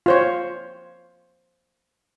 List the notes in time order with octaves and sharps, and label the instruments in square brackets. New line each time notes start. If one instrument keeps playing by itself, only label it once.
[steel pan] F4 C5 C#5